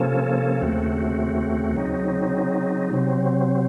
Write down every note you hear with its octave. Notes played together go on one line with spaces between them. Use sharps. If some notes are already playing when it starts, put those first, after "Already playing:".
Already playing: C3 F3 A#3 C#4 A4
D#2 C#3 A3 C4 F#4
C#3 F#3 C4 D#4
C3 F#3 C4